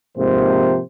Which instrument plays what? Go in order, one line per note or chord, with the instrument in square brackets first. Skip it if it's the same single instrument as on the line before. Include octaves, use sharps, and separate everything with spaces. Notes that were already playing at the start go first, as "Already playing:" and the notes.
[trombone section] G#2 C3 F3 A#3 C5